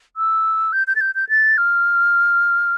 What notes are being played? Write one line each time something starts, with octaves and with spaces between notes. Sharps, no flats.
E6
G6
G6
A6
G6
G6
A6
F6